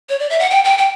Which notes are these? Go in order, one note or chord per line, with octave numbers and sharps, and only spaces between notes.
C#5
D5
E5
F#5
G5
G5
G5